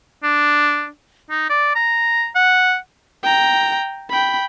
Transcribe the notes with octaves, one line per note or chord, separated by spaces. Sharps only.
D4
D#4
D5
A#5
F#5
G5 A#5
G5 B5